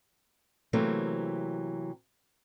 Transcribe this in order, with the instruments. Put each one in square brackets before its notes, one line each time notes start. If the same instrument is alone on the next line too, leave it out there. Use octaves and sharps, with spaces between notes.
[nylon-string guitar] C3 E3 F#3 A3 A#3 C4